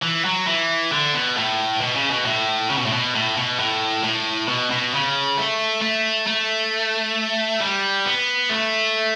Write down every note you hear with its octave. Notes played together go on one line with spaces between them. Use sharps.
E3
F#3
E3
D3
B2
A2
B2
C#3
B2
A2
C#3
B2
A2
B2
A2
B2
A2
A2
B2
B2
C#3
A3
A3
A3
G3
B3
A3